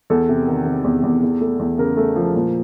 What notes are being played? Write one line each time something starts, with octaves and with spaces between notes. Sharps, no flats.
E2 A4
C3
D#3
C3
E2
E2
E2
A3
E2
C#3 A#4
A3
F3
A#2